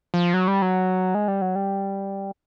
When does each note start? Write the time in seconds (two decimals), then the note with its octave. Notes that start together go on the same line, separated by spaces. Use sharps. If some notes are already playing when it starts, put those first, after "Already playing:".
0.14 F3
0.34 F#3
0.48 G3
0.62 F#3
1.14 G#3
1.28 G3
1.42 F#3
1.55 G3